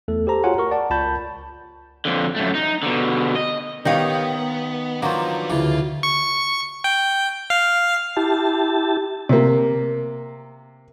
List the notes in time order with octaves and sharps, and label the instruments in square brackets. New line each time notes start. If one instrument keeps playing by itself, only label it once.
[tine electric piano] E2 A3 A4
G4 A4 C5 A5 A#5
F4 F#4 G#4 C#5 F#5 G#5
A#4 C#6
D5 F#5 A5
C#2 F4 A5 B5 G6
[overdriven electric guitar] F2 D3
F#2 A3
D#4
B2 D3
D#5
[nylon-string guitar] D#3 G4 F5 [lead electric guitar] B3 [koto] D#4 C#5
[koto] F3 F#3 [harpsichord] A#3 [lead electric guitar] D4 B4
[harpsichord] D2 C#3 E3 [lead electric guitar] F4
[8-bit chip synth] C#6
G5
F5
[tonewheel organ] E4 G4 A5
[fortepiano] C3 A#3